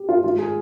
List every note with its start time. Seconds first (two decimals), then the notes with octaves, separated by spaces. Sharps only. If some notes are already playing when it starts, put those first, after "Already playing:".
Already playing: G4
0.09 F4
0.24 G#2 D#3 F4
0.38 G#4